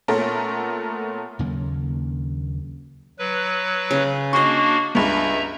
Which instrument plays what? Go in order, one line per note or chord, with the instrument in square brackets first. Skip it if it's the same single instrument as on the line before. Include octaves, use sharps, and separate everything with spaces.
[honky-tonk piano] A#2 A3 B3 C#4 A4 A#4
[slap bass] D#2 C#3 F#3 A#3
[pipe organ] F#3 B4
[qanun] C#3
[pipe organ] A#3 D4 F#4 [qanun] D#5 C6 [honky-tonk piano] C#6
[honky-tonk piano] C#2 G2 [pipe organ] E5 A#5